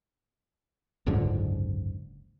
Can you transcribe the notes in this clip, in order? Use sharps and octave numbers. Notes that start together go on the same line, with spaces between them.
F#1 C#2 G#2 D3